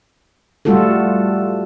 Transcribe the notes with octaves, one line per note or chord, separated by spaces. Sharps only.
G3 A3 F4 F#4 A4